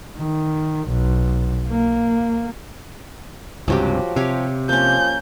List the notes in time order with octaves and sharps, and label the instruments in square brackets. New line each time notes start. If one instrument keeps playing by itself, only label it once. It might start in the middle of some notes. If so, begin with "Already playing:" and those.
[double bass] D#3
B1
A#3
[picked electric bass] C#2 G2 C3 [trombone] F3 [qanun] F#3 F#4 G4
[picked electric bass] C3 [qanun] G4 C#5 F5
[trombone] F3 [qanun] A#3 C#4 [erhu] G6